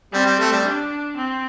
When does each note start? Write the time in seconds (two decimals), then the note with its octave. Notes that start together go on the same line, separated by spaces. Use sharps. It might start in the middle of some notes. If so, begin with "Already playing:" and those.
0.13 G3 C4
0.26 G3
0.39 A3
0.52 G3
0.65 D4
1.18 C4